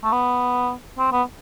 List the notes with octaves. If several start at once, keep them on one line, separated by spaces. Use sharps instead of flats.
A3
B3
C4
B3